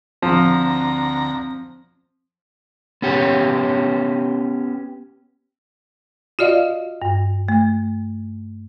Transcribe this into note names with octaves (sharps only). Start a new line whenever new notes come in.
D2 F3 C4 A#5
B3 C#4 G4 C#5
F4 F#4 D5 D#5 F5
G2
A3